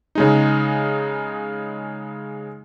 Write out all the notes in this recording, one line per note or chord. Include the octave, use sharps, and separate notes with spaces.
C#3 G#3 D#4